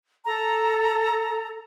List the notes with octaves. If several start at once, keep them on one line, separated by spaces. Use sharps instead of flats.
A4 A#5